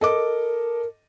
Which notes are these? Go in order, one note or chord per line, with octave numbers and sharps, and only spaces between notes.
A4 A#4 D#5 D6